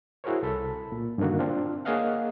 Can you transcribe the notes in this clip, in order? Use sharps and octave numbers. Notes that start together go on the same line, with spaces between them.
E4 F#4 G#4 A#4 C5 C#5
C2 A4 B5
A#2
G2 D3 D#3 A#3 F#4
C4 D4 F4
A#3 G#4 C#5 D#5 F5 F#5